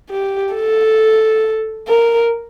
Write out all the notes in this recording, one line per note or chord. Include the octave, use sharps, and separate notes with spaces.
G4
A4
A#4